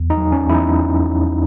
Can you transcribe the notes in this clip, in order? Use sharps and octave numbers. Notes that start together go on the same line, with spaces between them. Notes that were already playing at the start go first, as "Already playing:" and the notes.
Already playing: E2
D#4
F#3
C#4
E2 E4
D#4